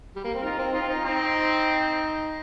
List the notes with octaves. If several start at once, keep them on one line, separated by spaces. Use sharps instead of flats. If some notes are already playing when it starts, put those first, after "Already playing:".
G3
A#3
C4
D#4 F4 A#4
C4
D#4 F4
C4
D#4
C4 D#4